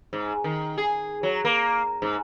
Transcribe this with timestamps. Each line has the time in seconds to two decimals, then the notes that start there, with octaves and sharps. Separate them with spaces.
0.13 G#2
0.44 D#3
0.78 G#4
1.23 F#3
1.45 A#3
2.02 G#2